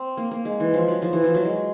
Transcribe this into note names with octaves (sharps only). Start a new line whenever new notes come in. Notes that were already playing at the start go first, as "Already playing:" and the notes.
Already playing: C4
A#3
A#3
G#3
E3
F3
F#3
F3
E3
F3
F#3
G#3